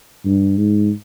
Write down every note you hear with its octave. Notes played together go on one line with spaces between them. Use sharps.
G2
G#2